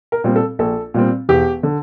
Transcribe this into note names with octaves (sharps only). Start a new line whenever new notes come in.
A#4
A#2 G3 C4
A4
A#1 A4
A#2 G3 C4
E1 G4
D3